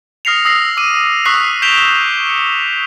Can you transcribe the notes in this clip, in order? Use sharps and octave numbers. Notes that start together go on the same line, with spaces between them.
D#6 F6 A#6 C7 C#7 F7
D#6 E6 A#6 C7
D6 E6 D#7
C#6 D#6 E6 F#6 B6 C7
G6 B6 D7 E7 F7 G7
C#7